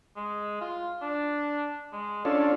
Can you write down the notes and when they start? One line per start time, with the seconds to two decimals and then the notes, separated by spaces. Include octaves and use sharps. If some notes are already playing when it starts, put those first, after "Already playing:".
0.16 G#3
0.61 F4
1.02 D4
1.93 G#3
2.25 C#4 D4 F4 A4